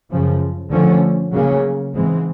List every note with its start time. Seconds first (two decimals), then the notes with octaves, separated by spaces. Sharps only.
0.10 F#2 C#3 F3
0.71 D3 F3 A3 C#4
1.33 C#3 F#3 A#3 C#4
1.94 G#2 E3 G#3 C4